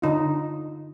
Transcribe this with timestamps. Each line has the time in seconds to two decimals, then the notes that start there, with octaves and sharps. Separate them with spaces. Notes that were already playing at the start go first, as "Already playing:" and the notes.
0.02 D3 D#4 F4